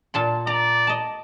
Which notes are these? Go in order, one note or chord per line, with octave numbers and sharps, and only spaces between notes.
A#2 A5 C6
D5 A#5
D#5 A5